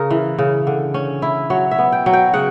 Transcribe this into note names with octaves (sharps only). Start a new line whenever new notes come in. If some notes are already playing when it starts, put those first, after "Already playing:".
Already playing: C#3 A#4
E3
C#3
D3
C#4
E4
F#3 C#5
E5
B3
G5
F#3
G5
C#3 F#5